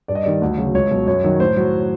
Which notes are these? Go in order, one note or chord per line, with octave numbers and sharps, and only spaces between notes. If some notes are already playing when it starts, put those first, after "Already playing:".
G2 D5
D#5
D#3 G3 D5
D2
C#3 F#3
C#2 C#5
B2 F#3
F#2 C#5
D#3 F#3
A2 C5
F#3